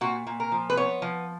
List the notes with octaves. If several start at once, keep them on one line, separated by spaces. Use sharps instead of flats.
A#2 F#4
A#2
A#4
F3
B4
B3 C#5
F3